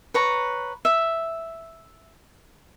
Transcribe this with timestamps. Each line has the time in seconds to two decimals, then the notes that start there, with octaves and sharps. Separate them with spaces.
0.14 B4 C#5 A#5
0.85 E5